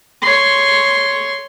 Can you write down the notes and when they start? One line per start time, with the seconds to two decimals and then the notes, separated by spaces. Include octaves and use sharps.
0.22 C#5 C6